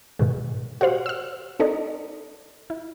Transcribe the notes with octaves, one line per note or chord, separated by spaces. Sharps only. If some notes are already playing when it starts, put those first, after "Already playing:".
G#2 B2 D#3 G#3
F#4 G4 C5 F5
E6 F6
C4 D4 D#4 A4 D#5
E4